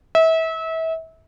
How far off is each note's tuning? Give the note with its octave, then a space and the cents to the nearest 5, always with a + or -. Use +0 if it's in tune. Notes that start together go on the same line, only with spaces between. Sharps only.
E5 -30